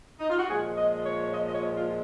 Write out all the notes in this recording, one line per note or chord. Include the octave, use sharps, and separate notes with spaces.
D#4
F4
F#4
A#2 F3 G#3 G#4
D#5
C#5
C#5
D#5
D#5
C#5
F4